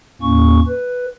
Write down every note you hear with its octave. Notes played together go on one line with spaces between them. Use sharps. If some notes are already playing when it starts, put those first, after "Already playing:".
D#2 A2 A#3 C#4 C#6
B4